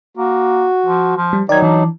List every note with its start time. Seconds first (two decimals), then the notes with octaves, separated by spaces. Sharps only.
0.17 A#3 F#4
0.86 F3
1.16 F3
1.33 G3
1.49 D#3 F#3 D#4 D5 G#6
1.63 E3 D4